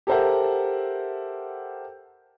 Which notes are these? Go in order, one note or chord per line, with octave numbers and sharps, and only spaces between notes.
G4 A4 A#4 C5 E5 F#5